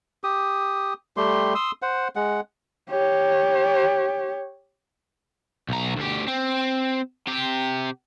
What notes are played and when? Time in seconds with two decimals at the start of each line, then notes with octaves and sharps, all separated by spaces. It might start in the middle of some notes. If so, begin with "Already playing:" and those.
0.24 G4 D#6
1.17 G3 A3 G4 C6
1.55 C6 D#6 E6
1.82 C5 F#5
2.16 G#3 F#5
2.90 G4 C#5
5.69 B1 A#5
5.97 D2 G4
6.28 C4
7.27 C3 G4